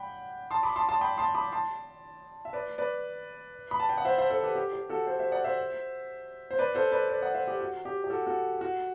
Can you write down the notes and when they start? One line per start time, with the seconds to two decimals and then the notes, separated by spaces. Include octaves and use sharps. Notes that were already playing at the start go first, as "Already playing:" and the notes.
Already playing: F#5 G5 B5
0.51 A5 C6
0.63 B5 D6
0.76 A5 C6
0.89 A5 C6
1.01 G5 B5
1.18 A5 C6
1.35 B5 D6
1.52 A5 C6
2.45 E5
2.53 B4 D5
2.78 B4 D5
3.71 B5
3.80 A5
3.89 G5
3.98 F#5
4.05 C5 E5
4.18 C5 E5
4.30 A4 C5
4.43 G4 B4
4.55 G4
4.73 G4
4.89 F#4 A4
5.07 A4 C5
5.19 C5 E5
5.32 D5 F#5
5.44 C5 E5
6.51 C5
6.59 B4 D5
6.75 A4 C5
6.92 B4 D5
7.09 B4 D5
7.21 D5 F#5
7.34 C5 E5
7.48 G4
7.60 F#4
7.85 G4
8.04 G4
8.10 F#4 A4
8.27 F#4 A4
8.61 F#4